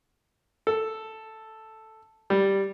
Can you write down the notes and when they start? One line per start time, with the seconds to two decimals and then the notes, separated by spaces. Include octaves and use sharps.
0.67 A4
2.30 G3